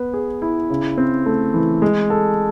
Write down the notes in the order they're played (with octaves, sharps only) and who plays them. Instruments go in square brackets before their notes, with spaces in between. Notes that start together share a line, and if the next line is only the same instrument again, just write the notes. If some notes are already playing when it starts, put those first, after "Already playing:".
Already playing: [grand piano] B3 B4
G#4
E4
C#3
C4
A3
E3
G#3
A4